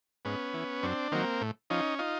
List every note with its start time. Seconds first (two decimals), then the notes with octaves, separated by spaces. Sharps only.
0.25 G#2 B3 C#4
0.54 E3
0.83 F#2 C4 D4
1.12 D#3 F#3 A#3 C4
1.41 A2
1.70 F3 C#4 D#4
1.99 D#4 F4